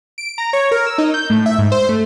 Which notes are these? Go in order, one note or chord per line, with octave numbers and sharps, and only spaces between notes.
D7
A#5
C#5
A#4
E6
D#4
G6
A2
E5
G#2
C5
A3